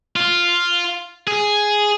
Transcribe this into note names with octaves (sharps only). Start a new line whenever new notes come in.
F4
G#4